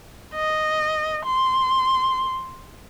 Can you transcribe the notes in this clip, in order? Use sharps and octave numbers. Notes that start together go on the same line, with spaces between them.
D#5
C6